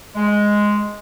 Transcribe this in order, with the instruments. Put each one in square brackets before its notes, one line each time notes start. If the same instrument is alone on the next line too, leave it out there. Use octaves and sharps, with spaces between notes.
[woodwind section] G#3